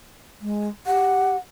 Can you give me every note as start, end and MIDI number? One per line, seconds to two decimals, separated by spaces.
0.41 0.69 56
0.86 1.36 67
0.86 1.37 78